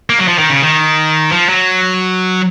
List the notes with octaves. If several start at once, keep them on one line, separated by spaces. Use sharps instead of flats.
A#3
F#3
F3
D#3
C#3
D#3
F3
F#3